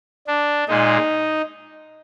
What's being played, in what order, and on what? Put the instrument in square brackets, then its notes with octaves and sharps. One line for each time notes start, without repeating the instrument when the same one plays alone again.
[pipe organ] D4
A#2 G#3 D#4